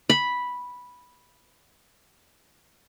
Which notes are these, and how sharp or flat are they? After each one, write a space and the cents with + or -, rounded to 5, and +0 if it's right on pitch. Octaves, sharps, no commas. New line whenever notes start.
B5 -5